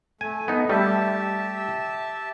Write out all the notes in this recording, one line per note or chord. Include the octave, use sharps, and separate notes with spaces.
A3 G#5
B3 D#4
G3 A3 G4 E5 A5